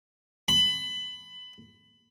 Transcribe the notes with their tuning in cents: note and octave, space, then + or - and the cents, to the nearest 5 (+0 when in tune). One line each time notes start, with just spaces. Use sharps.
B5 +20